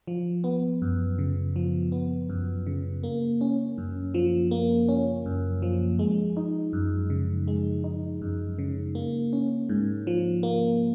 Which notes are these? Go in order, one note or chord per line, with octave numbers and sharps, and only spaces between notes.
F3
B3
F#2
C#3
F3
B3
F#2
C#3
A#3
C#4
F#2
F3
A#3
C#4
F#2
F3
G#3
D#4
F#2
C#3
G#3
D#4
F#2
C#3
A#3
C#4
G#2
F3
A#3